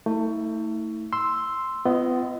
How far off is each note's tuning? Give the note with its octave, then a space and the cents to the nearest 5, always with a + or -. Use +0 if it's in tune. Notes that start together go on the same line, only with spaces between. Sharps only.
A3 +25 E4 -45
C6 +0 E6 +0
B3 +35 F4 -30 D#5 +0